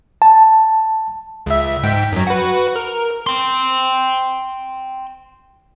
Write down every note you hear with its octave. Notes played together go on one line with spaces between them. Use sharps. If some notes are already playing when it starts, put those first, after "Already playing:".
A5
C#2 E5
G#2 G5 B6
F#2 F#3
F#4 B4
A#4
G5 C6